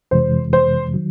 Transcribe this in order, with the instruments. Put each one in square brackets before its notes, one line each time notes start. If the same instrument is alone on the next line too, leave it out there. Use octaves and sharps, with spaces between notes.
[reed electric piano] F2 C3 E3 G#3 [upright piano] C5
[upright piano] C5
[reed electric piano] D#3 F#3